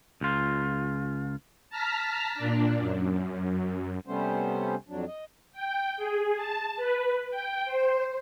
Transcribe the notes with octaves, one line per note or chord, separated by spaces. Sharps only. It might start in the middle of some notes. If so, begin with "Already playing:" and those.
C#2 F4
A5 A#5 F6 B6
A#2 D4
F#2
C3 G3 A3 B3 C#4 C5
F2 F#3 D4
D#5
G5
G#4
A5
B4
G5
C5